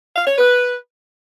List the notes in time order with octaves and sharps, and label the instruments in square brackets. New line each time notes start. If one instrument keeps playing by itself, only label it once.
[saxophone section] F5
C#5
B4